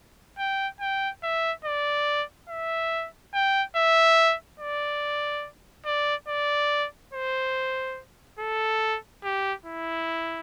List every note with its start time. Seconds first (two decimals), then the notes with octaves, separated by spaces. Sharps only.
0.38 G5
0.80 G5
1.23 E5
1.65 D5
2.49 E5
3.34 G5
3.76 E5
4.60 D5
5.86 D5
6.28 D5
7.13 C5
8.39 A4
9.24 G4
9.66 E4